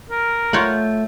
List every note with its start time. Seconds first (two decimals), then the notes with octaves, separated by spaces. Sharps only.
0.10 A#4
0.53 A3 F4 C#5 F#5 G6